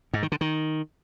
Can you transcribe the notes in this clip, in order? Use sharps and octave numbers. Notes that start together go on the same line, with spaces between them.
G#2
D#3
D3
D#3